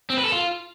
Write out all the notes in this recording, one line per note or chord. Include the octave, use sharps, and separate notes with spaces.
C4
B4
A4
F4